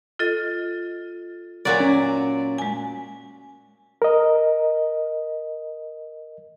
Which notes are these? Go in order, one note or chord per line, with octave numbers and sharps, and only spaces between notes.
F4 A4 D#5
A#2 F#3 D5
C#4
G#3 G#5
A#4 D#5